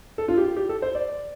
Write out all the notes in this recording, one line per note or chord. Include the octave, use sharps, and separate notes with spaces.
A4
F4
G4
G4
A4
C5
D5